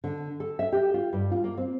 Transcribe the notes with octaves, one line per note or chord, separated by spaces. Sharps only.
D3
A4
E5
G4
F4
G2
F4
A#3
C4